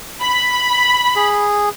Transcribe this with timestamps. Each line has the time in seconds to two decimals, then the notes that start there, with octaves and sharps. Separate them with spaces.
0.22 B5
1.16 G#4